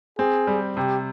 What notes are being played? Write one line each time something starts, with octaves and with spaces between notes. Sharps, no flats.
C4 G#4
G3
C3 G4